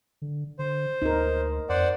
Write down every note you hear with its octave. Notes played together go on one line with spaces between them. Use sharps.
D3
D3 C5
D2 D#4 A#4
F2 C5 D5 F#5